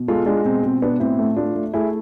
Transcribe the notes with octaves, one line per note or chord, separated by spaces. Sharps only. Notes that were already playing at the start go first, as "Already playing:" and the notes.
Already playing: B2
G#3 F4 A4
G#3 D4 F4
B2 C4
B2 C4
B2 B3 D4
A2 C4 E4
A3
A3 D4 F4
A3
A3 E4 G#4